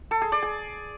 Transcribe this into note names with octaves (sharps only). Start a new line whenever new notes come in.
A4
G#4
D5
G#4